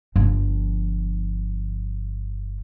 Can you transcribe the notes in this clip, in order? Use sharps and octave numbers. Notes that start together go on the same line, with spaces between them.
G1 F3